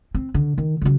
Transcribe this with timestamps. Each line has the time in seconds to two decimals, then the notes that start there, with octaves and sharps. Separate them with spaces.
0.15 C4
0.34 D3
0.58 D#3
0.81 C#3 F#3